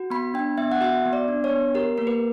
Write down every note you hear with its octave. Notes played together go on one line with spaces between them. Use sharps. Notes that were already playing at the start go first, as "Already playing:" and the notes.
Already playing: F#4
B3 B5
D4 G5
B3 E5
F#5
F#4 E5
B3
D5
D4
C#5
B3
G4 A#4
A#3 A#4
B4